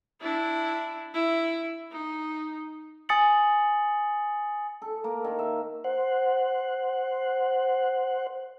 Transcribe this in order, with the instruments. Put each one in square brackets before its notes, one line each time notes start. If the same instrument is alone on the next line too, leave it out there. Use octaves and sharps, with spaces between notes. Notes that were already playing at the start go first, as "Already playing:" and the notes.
[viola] D4 E4
E4
D#4
[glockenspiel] G#5 D#6 A6 C#7 F#7
[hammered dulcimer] A4
A#3
D#3
E5
[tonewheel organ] C5 F#5